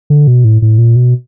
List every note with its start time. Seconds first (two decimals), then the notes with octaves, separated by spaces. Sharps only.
0.10 D3
0.27 B2
0.45 A2
0.62 A2
0.78 A#2
0.96 B2